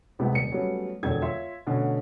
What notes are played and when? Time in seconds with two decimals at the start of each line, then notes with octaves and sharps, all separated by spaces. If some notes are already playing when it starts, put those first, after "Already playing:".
0.19 C#2 C3 G#3 B3
0.32 D#1 C#7
0.52 F#3 G3 A3 B3 C#4
1.03 E1 F2 D3 A4 C#5 G#6
1.22 F4 C#5 E5 C6
1.67 B2 D3 A3 C#4